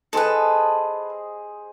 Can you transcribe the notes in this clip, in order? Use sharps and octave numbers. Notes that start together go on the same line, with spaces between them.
G#4 A4 B4 C5 D#5